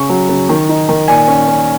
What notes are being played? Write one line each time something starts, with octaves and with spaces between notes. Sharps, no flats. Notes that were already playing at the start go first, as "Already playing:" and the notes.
Already playing: C#3 C#6
F#3
C#3
D#3
D#4
D#3
A#2 G#5
C#4
C#4